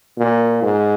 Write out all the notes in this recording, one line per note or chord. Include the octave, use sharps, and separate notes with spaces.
A#2
G#2